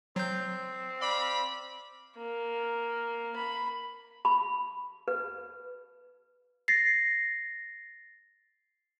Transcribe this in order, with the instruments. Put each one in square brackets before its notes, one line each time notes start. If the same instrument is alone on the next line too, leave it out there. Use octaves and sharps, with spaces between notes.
[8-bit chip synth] F#3 G6 [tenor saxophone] C4
[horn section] D5 F5 B5
[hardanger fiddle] A#3
B5
[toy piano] B5
B4
[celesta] A6 A#6 C7